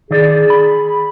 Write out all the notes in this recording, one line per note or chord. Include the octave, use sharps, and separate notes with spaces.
D#3 G#4 D5
B5